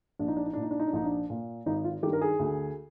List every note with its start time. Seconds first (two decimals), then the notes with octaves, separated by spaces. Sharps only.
0.19 A#1 D4
0.28 D#4
0.37 D4
0.45 D#4
0.53 A#2 D4
0.62 D#4
0.71 D4
0.80 D#4
0.87 D4
0.93 A#1 D#4
1.04 D4
1.30 A#2
1.66 G#1 D#4
1.84 F4
2.03 D#3 G4
2.06 G2
2.13 A#4
2.21 G#4
2.39 D2